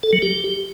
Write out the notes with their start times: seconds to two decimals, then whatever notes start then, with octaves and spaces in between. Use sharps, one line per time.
0.03 A4
0.13 F#3
0.22 G4